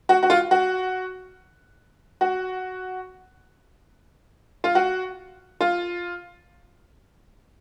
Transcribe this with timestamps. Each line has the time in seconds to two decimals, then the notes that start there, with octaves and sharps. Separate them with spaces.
0.09 F#4
0.23 F#4
0.30 F4
0.51 F#4
2.21 F#4
4.64 F4
4.75 F#4
5.61 F4